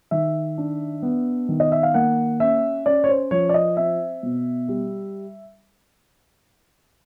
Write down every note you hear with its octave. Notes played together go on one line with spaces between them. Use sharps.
D#3 E5
D4
B3
D#3
D#5
E5
F5
A#3 F#5
C#4 E5
C#4 D5
C#5
C5
F3 C#5
D5
D#5
C4 E5
B2
G3